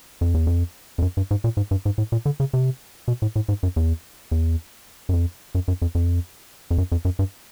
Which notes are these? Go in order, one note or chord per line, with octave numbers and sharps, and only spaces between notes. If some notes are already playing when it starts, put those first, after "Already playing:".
F2
E2
F2
F2
F#2
G2
G#2
A#2
G#2
G2
G#2
A2
A#2
D3
C#3
C3
B2
A2
A2
G#2
F#2
E2
E2
F#2
F2
F#2
F#2
F2
F2
F2
F#2
F2
F#2
G2